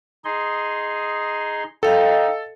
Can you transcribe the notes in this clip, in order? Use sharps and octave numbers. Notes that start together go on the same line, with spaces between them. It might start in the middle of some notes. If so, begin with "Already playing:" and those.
D#4 G#4 C6
D#4 A4 D#5 F5 G5